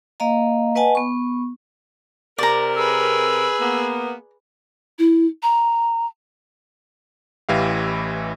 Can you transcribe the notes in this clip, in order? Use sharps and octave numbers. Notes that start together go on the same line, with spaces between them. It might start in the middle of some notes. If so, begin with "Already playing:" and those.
A#3 D#5 F5 A#5
B4 D#5 F#5 G#5 A5
B3 C#6
C3 A#4 D5 A#5
G#4 B4 E6
A#3 B3
E4
A#5
A1 E3 E4 G4 F5